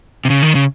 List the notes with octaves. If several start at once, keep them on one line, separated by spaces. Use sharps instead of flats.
C3
C#3
D#3
C#3